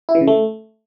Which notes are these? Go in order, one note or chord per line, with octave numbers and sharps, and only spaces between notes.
E4
E3
C#3
A3